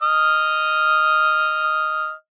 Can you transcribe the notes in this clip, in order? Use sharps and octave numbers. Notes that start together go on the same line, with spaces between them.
D#5 F6